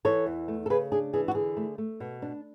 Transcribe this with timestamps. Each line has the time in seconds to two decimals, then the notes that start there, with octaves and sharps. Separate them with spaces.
0.05 E3 A4 C#5
0.26 E2
0.48 A3
0.66 A4
0.70 C#3 G#4 B4
0.92 D4 G#4
1.13 E3 G#4
1.28 F#4
1.35 D3 G#4
1.57 A3
1.78 A3
2.00 B2
2.22 D4